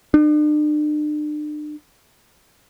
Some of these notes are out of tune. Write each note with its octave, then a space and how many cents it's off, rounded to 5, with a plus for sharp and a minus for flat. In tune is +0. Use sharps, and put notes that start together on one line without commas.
D4 +40